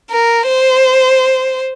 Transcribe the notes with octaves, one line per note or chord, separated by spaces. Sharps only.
A#4
C5